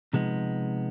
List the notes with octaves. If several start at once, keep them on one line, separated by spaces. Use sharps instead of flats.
C3 F3 G#3 B3 D#4